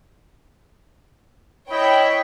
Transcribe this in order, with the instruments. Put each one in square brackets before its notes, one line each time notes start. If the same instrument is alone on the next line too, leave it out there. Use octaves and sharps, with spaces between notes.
[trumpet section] E4 D#5 B5 [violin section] C#5 G5